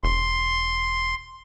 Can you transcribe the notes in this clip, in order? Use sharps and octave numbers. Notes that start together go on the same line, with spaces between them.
E1 C6